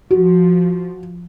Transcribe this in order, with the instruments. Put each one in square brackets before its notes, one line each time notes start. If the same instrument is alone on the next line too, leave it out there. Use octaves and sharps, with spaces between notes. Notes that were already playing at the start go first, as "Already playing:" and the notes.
[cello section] F3 [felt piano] F#4